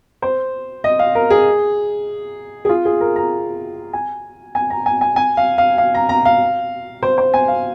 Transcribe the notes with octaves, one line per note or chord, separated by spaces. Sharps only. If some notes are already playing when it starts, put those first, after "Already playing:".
C5
D#5
F5
A#4
G#4
G#4
F4
G#4
A#4
A#5
G#5
G#5
A#5
G#5
G#5
G#5
F5
F5
F5
A#5
A#5
F5
C5
C5
G#5
F5